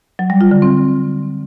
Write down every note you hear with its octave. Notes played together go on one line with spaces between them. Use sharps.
F#3
G3
F4
D3
C4